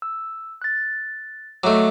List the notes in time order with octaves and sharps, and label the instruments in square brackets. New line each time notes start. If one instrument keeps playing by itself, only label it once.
[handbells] E6
F#6 A6
[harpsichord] F#3 A3 [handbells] D#5 E5 D6